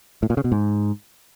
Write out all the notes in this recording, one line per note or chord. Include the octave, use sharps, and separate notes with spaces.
A2
A#2
C#3
B2
G#2